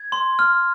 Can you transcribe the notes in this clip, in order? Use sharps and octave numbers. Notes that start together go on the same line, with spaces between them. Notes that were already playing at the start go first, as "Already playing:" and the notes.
Already playing: G#6
C6
F6